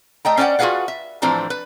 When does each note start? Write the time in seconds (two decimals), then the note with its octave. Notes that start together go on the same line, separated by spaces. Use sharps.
0.25 A3 D#5 G5 A#5
0.37 C#4 C5 D5 D#5 F#5 G5
0.59 F4 F#4 G#4 B4 F5 F#5
0.88 E5
1.22 A2 E3 F3 C4 D4 A#5
1.50 B4